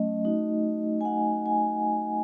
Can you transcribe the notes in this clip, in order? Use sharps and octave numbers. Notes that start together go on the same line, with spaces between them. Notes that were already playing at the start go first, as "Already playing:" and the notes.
Already playing: F#3 A3 C#4 D#5
A3 D#4 F#4
G#5
F#5
G#5